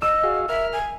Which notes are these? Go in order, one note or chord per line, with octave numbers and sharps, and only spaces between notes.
D#5 E6
F#4 G#4 F5
A#4 E5 F6
G#5